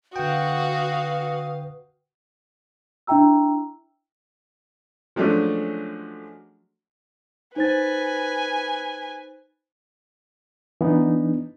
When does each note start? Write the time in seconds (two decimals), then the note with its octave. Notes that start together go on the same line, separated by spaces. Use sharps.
0.16 D3 F#4 B4 F5 G5 D#6
3.07 D4 E4 E5 G5 A#5 E6
5.16 F3 F#3 G#3 A3 C#4 D4
7.56 D#4 B4 C5 G#5 A6
10.81 E3 B3 D4 D#4